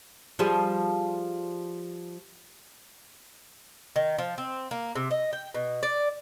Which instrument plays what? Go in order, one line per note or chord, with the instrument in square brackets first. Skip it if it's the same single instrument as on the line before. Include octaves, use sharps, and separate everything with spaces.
[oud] F3 G3 G#4
[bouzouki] D#3
F3
C4
A#3
C3
D#5
G5
B2
D5